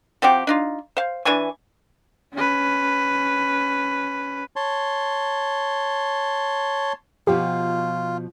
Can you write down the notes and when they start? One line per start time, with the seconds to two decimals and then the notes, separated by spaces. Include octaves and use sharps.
0.22 F3 C4 F#4 G4
0.47 D4 D#4 F4
0.97 C5 F5
1.25 E3 D4 G#5 C#6
2.33 C#4 B4
4.56 C#5 A5 C6
7.27 B2 F3 F4 G4